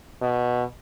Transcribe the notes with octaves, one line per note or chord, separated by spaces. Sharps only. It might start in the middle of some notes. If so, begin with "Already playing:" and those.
B2